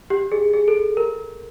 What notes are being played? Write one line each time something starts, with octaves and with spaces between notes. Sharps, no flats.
G4
G#4
G#4
A4
A#4